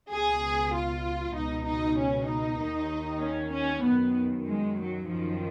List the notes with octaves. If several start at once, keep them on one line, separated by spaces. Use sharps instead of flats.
C#2 B2 G#4
F4
C#2 B2 D#4
D#4
C#4
D#4
D#2 D#3
C#4
C#4
F#2 D#3 B3
G#3
F#3
F#2 D#3 F3